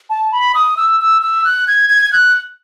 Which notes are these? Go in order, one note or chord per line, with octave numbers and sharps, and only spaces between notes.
A5
B5
D#6
E6
E6
E6
F#6
G#6
G#6
G#6
F#6